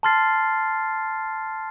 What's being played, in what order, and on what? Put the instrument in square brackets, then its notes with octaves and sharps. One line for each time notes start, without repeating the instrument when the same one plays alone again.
[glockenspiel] A5 C6 F6 A6 C7